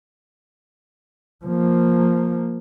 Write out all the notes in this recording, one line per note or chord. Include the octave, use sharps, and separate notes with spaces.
F3 A#3